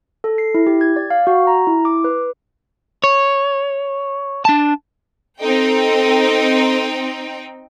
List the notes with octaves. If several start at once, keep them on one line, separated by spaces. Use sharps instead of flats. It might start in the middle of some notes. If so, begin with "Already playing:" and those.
A4
C7
E4
G4
G#6
D5
F5
F#4
A#5
E4
D6
B4
C#5
D4 A5
C4 D#4 A4 G5